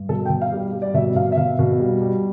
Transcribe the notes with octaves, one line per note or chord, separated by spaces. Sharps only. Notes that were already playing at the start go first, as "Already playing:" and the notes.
Already playing: G2
B2 A4
G5
B2
F5
G3 G4
G3
D5
B2 E5
B2 F5
E5
B2 F5
B2
G3
G3